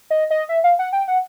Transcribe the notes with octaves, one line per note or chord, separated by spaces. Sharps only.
D#5
D#5
E5
F5
F#5
G5
F#5